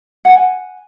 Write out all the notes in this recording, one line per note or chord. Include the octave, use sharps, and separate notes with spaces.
F#5 G#5